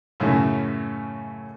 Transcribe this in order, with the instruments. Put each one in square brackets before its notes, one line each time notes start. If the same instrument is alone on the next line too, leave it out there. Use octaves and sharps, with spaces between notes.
[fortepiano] F#2 A2 C#3 A3 C#4 D#4